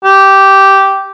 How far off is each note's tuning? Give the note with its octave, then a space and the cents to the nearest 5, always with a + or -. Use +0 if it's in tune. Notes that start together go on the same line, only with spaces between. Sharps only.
G4 -10